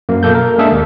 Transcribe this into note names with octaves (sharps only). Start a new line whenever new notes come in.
F#2 A#3
B2 A#3 A4 G6
A#4
G#3 A#3 D4 G#4 A4 E5
D#2